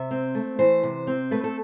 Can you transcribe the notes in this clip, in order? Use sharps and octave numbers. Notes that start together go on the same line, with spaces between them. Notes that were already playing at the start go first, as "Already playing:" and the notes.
Already playing: C3 E5
C4
A3
E3 C5
C3
C4
A3 B4
A4